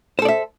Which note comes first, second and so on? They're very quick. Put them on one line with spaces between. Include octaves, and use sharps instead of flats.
C5 A4 D5 E5